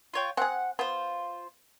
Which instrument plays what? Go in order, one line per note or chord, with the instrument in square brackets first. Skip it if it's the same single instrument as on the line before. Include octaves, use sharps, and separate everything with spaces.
[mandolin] F4 C#5 G5
[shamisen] C4 G#4 [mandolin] F#5
[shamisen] B3 [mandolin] F4 C5